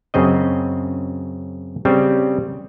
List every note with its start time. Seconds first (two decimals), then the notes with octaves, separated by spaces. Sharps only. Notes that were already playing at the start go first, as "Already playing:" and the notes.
0.14 F#2 C#3 C4 D#5
1.85 C#3 G3 C4